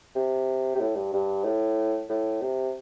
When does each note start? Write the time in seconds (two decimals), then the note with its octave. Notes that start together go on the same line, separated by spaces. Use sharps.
0.15 C3
0.75 C3
0.80 A2
0.96 G2
1.13 G2
1.45 A2
2.09 A2
2.41 C3